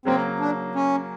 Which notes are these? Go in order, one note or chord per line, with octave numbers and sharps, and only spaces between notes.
C#3 F#3 A#3 C4
D4
C#4